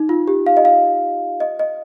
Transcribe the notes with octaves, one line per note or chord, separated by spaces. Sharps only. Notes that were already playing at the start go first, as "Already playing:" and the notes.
Already playing: D#4
F4
G4
F5
D#5
F5
D#5
D#5